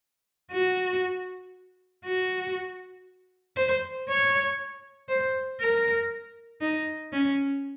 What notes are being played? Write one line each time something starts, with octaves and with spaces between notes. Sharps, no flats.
F#4
F#4
C5
C#5
C5
A#4
D#4
C#4